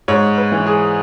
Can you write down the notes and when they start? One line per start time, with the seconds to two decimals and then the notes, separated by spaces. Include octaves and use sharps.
0.08 G#2 C#5
0.37 B4
0.52 E3
0.66 G#4